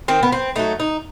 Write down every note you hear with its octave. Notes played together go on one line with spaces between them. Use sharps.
D#3 C4
B3
C4
F#3 A3 D#4
D#4